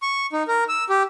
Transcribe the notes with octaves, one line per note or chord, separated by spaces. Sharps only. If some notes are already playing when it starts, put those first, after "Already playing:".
C#6
D#4
A#4
E6
G4